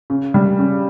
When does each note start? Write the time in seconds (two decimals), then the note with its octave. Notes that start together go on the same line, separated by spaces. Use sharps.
0.10 C#3
0.34 G3
0.59 C#3